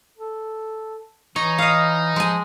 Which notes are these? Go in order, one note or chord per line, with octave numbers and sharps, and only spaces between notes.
A4
E3 D#4 C#5
D#5 F5
F3 G#3 G#5